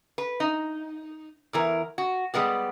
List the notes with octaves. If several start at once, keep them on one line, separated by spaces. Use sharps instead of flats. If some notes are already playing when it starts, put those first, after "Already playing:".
B4
D#4
E2 E3 A#4
F#4
G3 G#3 B3 G4